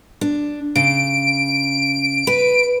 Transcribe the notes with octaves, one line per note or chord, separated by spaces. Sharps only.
D4
C#3 D7
B4